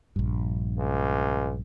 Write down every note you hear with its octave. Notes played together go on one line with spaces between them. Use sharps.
A#1 G2
C#2